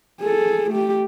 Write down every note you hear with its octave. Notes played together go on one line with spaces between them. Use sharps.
G#4 A4
A3 G4